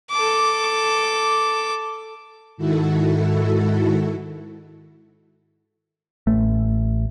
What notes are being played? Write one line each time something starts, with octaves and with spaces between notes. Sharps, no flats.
A4 D6
G#2 D#3 E4 F#4 A4
A1 A3